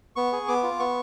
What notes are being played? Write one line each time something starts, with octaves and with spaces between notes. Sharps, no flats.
B3 C#6
G#4
B3 D6
F4
B3 C#6